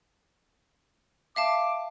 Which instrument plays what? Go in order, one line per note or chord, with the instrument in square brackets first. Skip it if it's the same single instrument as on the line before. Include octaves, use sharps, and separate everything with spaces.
[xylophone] E5 F5 A5 [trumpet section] D6